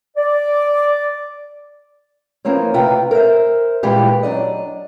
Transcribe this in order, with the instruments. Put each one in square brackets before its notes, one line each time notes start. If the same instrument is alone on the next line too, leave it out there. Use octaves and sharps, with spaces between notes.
[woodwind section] D5
[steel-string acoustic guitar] E3 F3 A#3 C4 C#4
D2 C3 F4 B4 G5 A#5
A#4 C5 E5
A#2 E3 G3 G#3 F4 G4
F#3 D4 D5 D#5